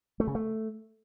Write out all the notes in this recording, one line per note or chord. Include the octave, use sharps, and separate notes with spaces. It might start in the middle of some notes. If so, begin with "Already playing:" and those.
A3
C#3
A3